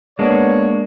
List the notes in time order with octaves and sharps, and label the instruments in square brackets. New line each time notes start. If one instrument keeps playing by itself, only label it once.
[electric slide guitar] G#3 A#3 D4 [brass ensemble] B3 C#5